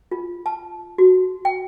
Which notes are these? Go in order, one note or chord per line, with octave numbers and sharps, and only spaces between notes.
F4
A5
F#4
G5